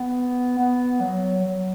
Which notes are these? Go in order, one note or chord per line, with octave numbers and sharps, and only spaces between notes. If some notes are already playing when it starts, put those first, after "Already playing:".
Already playing: B3
B3
F#3
F#3